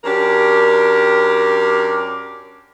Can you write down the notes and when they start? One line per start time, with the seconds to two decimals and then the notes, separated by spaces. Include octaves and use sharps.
0.04 F#2 D4 G4 A#4